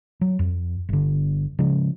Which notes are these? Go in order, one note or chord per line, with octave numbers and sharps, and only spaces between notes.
F#3
F2
G1 D3
C#3 F3 G#3